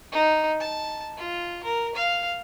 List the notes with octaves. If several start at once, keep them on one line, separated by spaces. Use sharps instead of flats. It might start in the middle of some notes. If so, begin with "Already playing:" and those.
D#4
A5
F4
A#4
F5